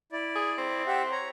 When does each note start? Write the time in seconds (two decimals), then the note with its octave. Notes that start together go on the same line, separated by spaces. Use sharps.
0.12 E4 D5
0.36 G#4
0.58 C4
0.87 G4 E5 F#5
1.11 C#5 A#5